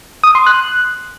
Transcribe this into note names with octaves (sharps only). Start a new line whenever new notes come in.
D#6
C6
F#6